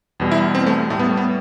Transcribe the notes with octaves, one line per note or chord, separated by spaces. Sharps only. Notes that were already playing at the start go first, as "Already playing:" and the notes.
E2 B2 G3
E4
C4
A3
A2 G3 A3 B3
A3
B3